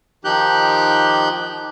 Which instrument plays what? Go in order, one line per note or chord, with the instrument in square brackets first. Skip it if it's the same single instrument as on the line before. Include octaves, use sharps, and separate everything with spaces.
[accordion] D#3 F3 D#4 G4 F#6 G6